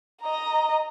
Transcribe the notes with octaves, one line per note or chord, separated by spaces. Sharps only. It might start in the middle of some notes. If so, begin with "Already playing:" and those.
D#5 A#5